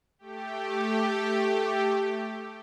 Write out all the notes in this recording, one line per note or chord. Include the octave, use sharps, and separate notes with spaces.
A3 G4